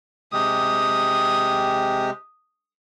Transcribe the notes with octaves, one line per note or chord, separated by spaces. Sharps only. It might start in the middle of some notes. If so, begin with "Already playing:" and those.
C3 G#3 G4 D#6